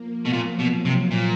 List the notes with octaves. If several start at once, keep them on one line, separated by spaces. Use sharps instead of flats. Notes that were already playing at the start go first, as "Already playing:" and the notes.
Already playing: F3 A#3
B2
A#2 F#3
B2
C3
A#2